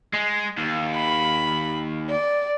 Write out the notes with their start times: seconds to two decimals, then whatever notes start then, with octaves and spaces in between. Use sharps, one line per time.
0.13 G#3
0.57 D#2
0.96 B5
2.10 D5